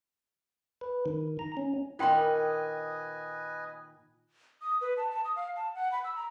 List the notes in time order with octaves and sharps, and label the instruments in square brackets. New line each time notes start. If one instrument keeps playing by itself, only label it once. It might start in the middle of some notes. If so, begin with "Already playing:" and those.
[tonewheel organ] B4
D#3
A#5
C#4
[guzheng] A#2 D#3 [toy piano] F4 G5 C6 [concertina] B4 D#5 G#5
[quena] D#6
B4
A5
A5
D#6
F5
A5
F#5
B5
E6
A#5